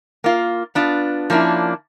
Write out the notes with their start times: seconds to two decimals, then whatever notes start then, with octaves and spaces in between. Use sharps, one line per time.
0.24 A#3 F4
0.75 B3 D4 F4
1.30 F3 A#3 C#4 D4 E4